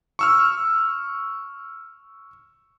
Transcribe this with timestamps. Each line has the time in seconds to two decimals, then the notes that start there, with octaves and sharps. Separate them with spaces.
0.19 C#6 E6 F6